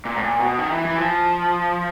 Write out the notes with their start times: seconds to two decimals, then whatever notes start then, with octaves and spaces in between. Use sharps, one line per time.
0.05 A#2
0.16 A2
0.23 A#2
0.40 B2
0.59 D#3
0.71 E3
0.85 E3
0.98 F3